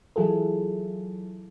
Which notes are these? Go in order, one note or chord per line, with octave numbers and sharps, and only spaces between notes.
E3 F#3 E4 F4 G#4 A4